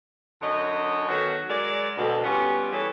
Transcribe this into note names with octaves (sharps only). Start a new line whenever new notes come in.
F#2 D3 D#4 C#5 D#5
D#3 F#3 B3 F#4 A4 C#5
F#3 G#3 A#4 D5
D2 B2 A4
G3 B3 C#4 F4 G4
E3 G3 G#4 A4 C#5